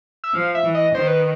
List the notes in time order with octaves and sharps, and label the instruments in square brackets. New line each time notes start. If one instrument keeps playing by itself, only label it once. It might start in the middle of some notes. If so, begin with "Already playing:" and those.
[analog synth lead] E5
[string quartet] F3 [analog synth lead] F5
[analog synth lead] E5
[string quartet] E3
[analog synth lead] D#5
[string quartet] D#3 [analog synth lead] C5
[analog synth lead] B4